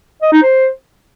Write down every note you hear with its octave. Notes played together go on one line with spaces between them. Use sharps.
D#5
D#4
C5